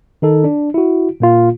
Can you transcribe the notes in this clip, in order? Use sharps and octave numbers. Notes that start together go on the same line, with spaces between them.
D#3 D#4 A4
D4
E4 F#4
A#2 A#3 F4